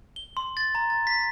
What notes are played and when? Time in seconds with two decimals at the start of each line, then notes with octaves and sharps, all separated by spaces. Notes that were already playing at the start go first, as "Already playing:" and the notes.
0.16 G7
0.37 C6
0.57 A6
0.75 A#5
0.90 A6
1.07 B6